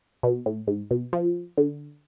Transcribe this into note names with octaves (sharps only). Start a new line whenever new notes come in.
B2
A2
G#2
B2
F3
D3